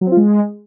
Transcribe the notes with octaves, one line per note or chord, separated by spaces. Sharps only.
F#3
C4
F4
G#3